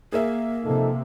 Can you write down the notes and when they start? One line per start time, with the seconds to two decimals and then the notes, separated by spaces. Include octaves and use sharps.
0.12 A#3 G#4 A#4 E5
0.65 C3 F3 D#4 A4